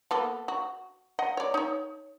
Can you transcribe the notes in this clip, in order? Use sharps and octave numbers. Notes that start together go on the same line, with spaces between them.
A#3 B3 A4
F#4
D#5 F#5
C#5 D5
D#4 C#5